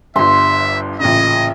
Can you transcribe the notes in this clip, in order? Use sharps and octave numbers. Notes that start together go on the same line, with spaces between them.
G1 G2 E5 C6
A1 A#2 C#3 D#5